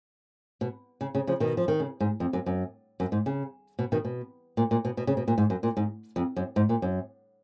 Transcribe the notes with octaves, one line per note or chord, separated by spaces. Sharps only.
B2
C#3
C#3
C#3 F3
B2 D#3
F3
D#3
C#3
G#2
F2
F#2
F#2
F#2
G#2
C#3
B2
B2 D#3
B2
A#2
A#2
B2
B2
C#3
B2
A#2
G#2
F#2
A#2
G#2
F2
F#2
G#2
A#2
F#2